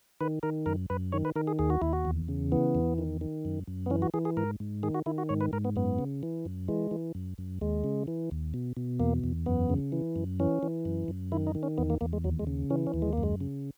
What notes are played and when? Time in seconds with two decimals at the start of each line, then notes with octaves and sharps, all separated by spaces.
0.21 D#3 B4
0.43 D#3 A#4
0.66 F#2 A#4
0.90 F#2 B4
1.12 D#3 C#5
1.25 B4
1.36 D#3 A#4
1.47 G#4
1.59 D#2 G#4
1.70 F#4
1.82 D#2 E4
1.93 F#4
2.05 E2
2.28 C#3
2.52 E3 B3
2.75 E2
2.98 D#3
3.21 D#3
3.45 F#2
3.68 F#2
3.86 B3
3.90 E3 C#4
4.02 F#4
4.14 E3 G#4
4.25 G#4
4.37 G#2 A#4
4.60 G#2
4.83 D#3 G#4
4.94 F#4
5.06 D#3 E4
5.18 F#4
5.29 G#2 C#5
5.41 B4
5.53 G#2 A#4
5.65 B3
5.76 F#2 B3
5.99 C#3
6.23 E3
6.45 F#2
6.68 E3 G#3
6.91 E3
7.15 F#2
7.38 F#2
7.61 D#2 G#3
7.84 C#3
8.07 E3
8.31 D#2
8.54 B2
8.77 B2
9.00 E2 A#3
9.24 E2
9.46 F#2 B3
9.70 C#3
9.92 E3
10.16 F#2
10.40 E3 C#4
10.63 E3
10.85 F#2
11.08 F#2
11.32 D#3 E4
11.47 D#4
11.55 D#3
11.63 C#4
11.78 E2 B3
11.90 A#3
12.01 E2 A#3
12.13 G#3
12.24 D#2 F#3
12.39 G#3
12.47 C#3
12.70 E3 C#4
12.87 C#4
12.94 D#2
13.02 G#3
13.13 F#2 A#3
13.23 G#3
13.41 C#3